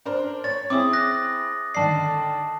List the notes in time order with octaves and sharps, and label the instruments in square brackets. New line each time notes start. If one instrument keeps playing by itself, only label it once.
[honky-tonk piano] D4 A#4 C5
[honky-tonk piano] C#5 [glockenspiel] A6
[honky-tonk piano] C4 E4 G#4 [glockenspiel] D6 D#6
[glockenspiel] F#6 A#6
[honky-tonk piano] D3 D#3 D5 [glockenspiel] A5 C7